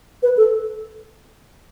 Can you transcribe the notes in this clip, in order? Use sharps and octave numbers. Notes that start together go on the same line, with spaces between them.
B4
A4